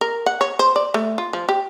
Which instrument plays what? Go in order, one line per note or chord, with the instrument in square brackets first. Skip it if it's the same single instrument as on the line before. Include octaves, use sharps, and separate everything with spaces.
[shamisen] A#4
F#5
C#5
C5
D5
A3
F4
F3
G4